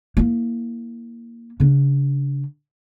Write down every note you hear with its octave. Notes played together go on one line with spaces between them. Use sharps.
A#3 E4
C#3 D4